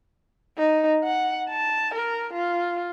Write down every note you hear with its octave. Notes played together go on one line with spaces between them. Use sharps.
D#4
F#5
A5
A#4
F4